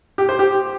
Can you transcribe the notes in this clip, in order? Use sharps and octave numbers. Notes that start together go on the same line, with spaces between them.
G4
C5
G4